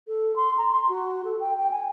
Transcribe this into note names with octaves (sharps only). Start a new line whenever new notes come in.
A4
C6
A#5
C6
F#4
A4
G5
G5
G#5